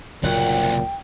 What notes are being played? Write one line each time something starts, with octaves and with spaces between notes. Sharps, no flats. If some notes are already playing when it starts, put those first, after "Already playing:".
F#1 C2 F#2 A#2 F#3 F#5 G5